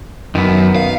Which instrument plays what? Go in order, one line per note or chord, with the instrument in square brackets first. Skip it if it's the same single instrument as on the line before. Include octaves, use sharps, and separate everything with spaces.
[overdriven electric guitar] F#2 [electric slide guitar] D#3 B3
[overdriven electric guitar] F5